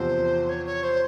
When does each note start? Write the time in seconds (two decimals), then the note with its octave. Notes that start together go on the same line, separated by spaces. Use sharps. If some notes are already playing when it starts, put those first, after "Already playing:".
Already playing: E2 C3 F3 C4 C5
0.49 C#5
0.66 C#5
0.84 C5